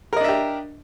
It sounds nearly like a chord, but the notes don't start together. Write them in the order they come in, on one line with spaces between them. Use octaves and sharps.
A#4 D#5 D4 E5 G4